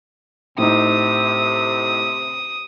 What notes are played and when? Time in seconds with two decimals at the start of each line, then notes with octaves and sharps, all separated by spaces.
0.58 A2 C3 D#4 D#6